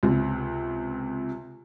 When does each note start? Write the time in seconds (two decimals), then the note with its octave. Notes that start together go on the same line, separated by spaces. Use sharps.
0.03 C#2 C3